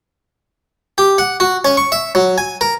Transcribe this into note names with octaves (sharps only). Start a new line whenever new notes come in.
G4
F#5
F#4
C#4
C#6
E5
F#3
G#5
A#4